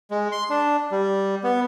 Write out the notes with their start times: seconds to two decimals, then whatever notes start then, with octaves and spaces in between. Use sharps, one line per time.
0.11 G#3
0.32 C6
0.50 D4
0.92 G3
1.43 B3